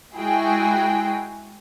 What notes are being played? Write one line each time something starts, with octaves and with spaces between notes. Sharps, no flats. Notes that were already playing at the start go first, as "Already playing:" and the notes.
G#3 E4 F#4 G#4 G5